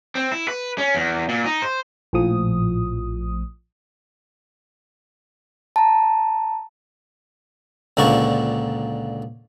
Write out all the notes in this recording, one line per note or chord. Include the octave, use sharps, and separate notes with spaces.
C4
E4
B4
C#4
E2
A#2
D#4
C5
A#1 A2 F3 D#6
A5 A#5
C#2 A#2 D3 C4 D4 C#6